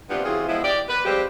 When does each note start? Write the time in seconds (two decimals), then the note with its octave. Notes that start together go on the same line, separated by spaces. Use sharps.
0.10 G2 C3 G3 B3 F4 G4
0.24 C#3 E3 C4 F4 F#4 G#4
0.48 F3 G#3 B3 E4
0.63 G4 D5
0.89 B4
1.05 F3 G3 G#3 C4 G4